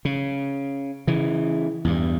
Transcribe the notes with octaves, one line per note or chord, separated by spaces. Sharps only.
C#3
C#3 E3
E2 G2